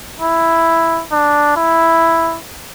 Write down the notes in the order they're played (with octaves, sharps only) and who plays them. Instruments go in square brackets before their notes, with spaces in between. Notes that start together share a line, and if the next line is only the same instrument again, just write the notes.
[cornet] E4
D4
E4